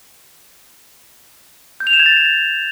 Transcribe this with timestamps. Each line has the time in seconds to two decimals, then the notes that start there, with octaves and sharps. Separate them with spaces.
1.80 G6
1.87 F7
1.93 E7
2.00 G#6
2.06 A6